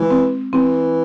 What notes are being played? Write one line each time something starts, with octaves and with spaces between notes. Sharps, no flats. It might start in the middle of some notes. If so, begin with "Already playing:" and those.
Already playing: E3 G#3
C4
E3 C4